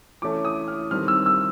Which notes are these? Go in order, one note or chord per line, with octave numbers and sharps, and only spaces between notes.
E3 A3 C#4 D6
D#6
F6
D#3 G3 C4 F6
E6
E6